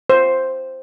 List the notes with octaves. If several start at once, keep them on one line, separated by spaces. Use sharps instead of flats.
C5